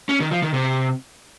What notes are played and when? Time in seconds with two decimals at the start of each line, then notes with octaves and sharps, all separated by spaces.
0.09 C#4
0.20 D#3
0.31 F3
0.42 D#3
0.54 C3